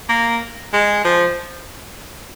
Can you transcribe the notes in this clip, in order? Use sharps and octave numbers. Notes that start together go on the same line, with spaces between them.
A#3
G#3
F3